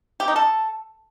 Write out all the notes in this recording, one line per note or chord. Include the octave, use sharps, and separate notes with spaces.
G4
D#4
A4